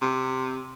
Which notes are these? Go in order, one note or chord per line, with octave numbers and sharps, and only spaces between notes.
C3